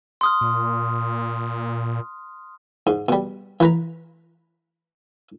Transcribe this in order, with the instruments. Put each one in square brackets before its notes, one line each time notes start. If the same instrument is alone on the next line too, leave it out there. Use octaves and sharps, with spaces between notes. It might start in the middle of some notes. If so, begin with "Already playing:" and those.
[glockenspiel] C6 D#6 F6
[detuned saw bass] A#2
[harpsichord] G#2
B2 G3
E3 B4 A#5